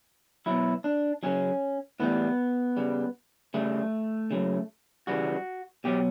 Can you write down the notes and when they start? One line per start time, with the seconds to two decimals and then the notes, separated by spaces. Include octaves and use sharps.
0.46 B2 F#3 E4
0.84 D4
1.23 C#3 F#3 C#4
2.00 A2 E3 G3 B3
2.77 C#3 G3
3.54 C#3 G3 A3
4.31 C#3 F#3
5.07 C#3 E3 G3 F#4
5.84 B2 F#3 G4